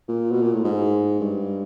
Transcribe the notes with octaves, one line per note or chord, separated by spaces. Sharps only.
A#2
B2
A#2
A2
G#2
G2